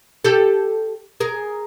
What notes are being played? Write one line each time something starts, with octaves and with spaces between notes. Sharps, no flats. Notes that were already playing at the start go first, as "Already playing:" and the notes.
G4 A4
G#4 A#4